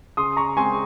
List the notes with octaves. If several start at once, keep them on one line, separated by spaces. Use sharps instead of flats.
C#3 C6 D#6
A#5 C#6
G#3 C4 G#5 C6